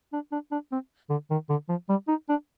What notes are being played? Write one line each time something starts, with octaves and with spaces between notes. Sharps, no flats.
D4
D4
D4
C4
D3
D#3
D3
F3
G3
D#4
D4